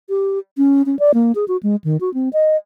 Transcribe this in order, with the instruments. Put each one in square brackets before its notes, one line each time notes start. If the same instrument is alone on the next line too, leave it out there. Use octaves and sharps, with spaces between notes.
[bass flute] G4
C#4
C#4
D5
A#3
G#4
F#4
G#3
D#3
F#4
C4
D#5